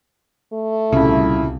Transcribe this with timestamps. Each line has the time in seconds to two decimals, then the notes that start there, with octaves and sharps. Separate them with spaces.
0.53 A3
0.93 D#1 C2 C#3 E4